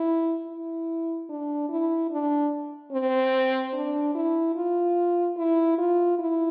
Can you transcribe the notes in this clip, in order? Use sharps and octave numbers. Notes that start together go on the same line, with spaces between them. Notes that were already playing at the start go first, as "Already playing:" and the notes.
Already playing: E4
E4
D4
E4
D4
C4
D4
E4
F4
E4
F4
E4